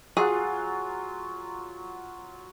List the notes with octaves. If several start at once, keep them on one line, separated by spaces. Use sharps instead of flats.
F#3 F4 G#4 F#5